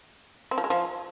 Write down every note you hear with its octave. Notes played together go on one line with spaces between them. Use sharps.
C4
F3
G#3
F3